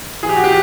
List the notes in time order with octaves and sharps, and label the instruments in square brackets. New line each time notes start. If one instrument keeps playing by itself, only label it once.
[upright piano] E3 G#4
G4
F#4
G4